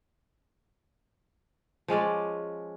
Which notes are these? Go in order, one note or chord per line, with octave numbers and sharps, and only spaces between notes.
F3 G#3 C#4 D5